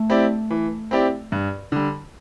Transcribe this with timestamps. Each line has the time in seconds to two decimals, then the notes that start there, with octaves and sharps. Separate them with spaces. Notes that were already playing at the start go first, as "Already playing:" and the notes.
Already playing: A3
0.10 C4 E4 G4 D5
0.51 E3
0.91 C4 E4 G4 D5
1.32 G2
1.72 D3 G3